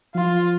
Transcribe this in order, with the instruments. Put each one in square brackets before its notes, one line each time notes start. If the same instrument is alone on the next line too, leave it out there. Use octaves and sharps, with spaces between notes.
[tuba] F3 [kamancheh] F4